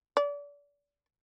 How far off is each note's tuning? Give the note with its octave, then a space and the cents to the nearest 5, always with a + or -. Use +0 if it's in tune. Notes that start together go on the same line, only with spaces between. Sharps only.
D5 -30